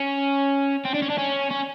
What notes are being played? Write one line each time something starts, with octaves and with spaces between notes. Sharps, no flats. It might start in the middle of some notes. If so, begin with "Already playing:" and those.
Already playing: C#4
C4
D4
C#4
D4
C#4
C#4